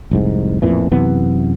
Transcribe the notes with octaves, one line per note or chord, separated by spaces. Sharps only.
F1 C2 G#2
A1 F2 A#2 E3
F#2 C3 E3 B3